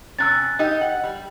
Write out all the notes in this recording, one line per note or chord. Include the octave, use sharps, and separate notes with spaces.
C3 C#4 E6 F#6 A6
D#4 G4 D#5
F#5
G3